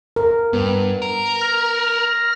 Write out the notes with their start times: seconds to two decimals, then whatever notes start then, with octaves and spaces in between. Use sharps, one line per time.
0.16 A#4
0.53 G2 B3
1.02 A#4
1.41 F6 A#6